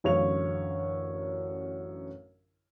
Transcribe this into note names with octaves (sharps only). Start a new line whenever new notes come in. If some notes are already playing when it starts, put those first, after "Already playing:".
A1 F#2 D3 C#5 F5 F7